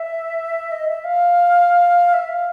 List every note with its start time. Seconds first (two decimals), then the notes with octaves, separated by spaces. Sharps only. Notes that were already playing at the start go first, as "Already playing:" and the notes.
Already playing: E5
0.72 D#5
0.88 E5
1.04 F5
2.13 E5
2.29 F5